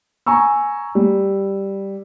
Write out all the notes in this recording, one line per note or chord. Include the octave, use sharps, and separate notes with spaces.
G#5 A#5 C#6 E6
G3